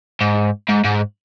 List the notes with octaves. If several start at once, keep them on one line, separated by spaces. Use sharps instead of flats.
G#2
G#2
G#2